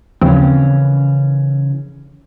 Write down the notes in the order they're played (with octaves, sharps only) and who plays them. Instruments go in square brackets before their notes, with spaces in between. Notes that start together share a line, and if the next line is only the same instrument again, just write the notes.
[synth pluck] D#2 F3 C4 [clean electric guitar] C#3 E3 C#4